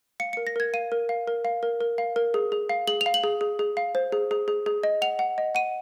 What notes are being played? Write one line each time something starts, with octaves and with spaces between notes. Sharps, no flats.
F5 C#7
C#7
A#4
A#6
A#4 G#6
F5 D#7
A#4
F5
A#4
F5
A#4
A#4
F5
A#4
G#4
G#4
F5
G#4 F#7
F7
F5
F#7
G#4
G#4
G#4
F5
C5
G#4
G#4
G#4
G#4
D#5
F#5 F7
F#5
D#5
F#5 D#7